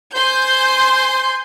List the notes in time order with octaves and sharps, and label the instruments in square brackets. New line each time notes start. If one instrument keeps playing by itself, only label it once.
[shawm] C5 [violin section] G#5 C6 G6